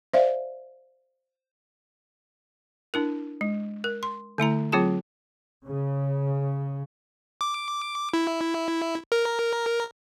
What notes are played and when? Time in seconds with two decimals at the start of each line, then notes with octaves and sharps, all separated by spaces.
0.13 C5 D5 E5 F5
2.94 D4 E4 A#4
3.41 G#3
3.84 A#4
4.03 C6
4.38 D3 A3 E4 A#5
4.72 F#3 C4 F4 G#4 A5
5.66 C#3
7.41 D6
8.14 E4
9.12 A#4